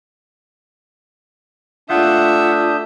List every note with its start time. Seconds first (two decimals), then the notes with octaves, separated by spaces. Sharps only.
1.90 A3 D4 F4 E5 F#5 D#6 G6